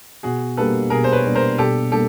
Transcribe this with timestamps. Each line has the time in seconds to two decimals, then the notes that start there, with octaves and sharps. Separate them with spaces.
0.23 B2 F#4 G#4
0.57 G3 A#3 D4 A4 B4
0.90 B2 G#4 A#4
1.04 C5
1.12 B4 C#5
1.24 G3 A#3 D4
1.35 A#4 C5
1.58 B2 G4 A4
1.92 G3 A#3 D4 G4 A4